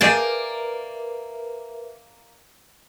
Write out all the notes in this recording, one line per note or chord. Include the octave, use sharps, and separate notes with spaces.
A#3 G#4 A#4 B4 D5 E5 G5 A5